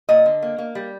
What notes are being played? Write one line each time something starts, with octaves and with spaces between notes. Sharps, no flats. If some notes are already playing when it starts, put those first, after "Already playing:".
A#2 D#5
D3
A#3
A#3
G3